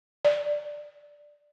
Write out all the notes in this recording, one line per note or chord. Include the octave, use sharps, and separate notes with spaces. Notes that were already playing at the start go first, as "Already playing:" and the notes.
D5